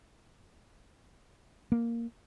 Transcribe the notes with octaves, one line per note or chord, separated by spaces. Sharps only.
A#3